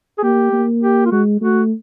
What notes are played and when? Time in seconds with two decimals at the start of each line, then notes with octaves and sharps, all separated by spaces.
0.18 G#4
0.23 A#3 G4
0.53 A#3
0.83 G4
1.06 F4
1.12 G#3 F#4
1.41 A3 F#4